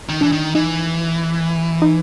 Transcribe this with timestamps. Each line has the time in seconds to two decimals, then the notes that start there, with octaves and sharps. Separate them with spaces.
0.09 D#3
0.21 E3 D4
0.32 D#3
0.55 E3 D#4
1.82 D#4